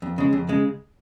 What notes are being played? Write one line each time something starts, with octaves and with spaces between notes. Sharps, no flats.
F2
C#3 G#3
F2
C#3 G#3